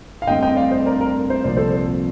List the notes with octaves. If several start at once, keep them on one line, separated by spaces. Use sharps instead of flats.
F5
G2 D3 A3 C4 D#5 G5
D#5 G5
D5 F5
C5 D#5
A#4 D5
A#4
C5
C2 A#2 F3 D5
A4 C5